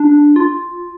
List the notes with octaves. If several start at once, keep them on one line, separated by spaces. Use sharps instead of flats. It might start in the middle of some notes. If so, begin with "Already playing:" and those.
Already playing: D4
F4